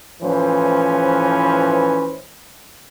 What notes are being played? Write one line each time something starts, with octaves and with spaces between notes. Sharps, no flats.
A2 E3 F3 C#4 B4 C5